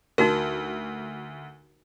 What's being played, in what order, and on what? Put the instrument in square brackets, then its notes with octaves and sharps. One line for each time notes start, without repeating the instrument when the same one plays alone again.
[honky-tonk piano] D2 [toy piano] D#4 F#4 A#4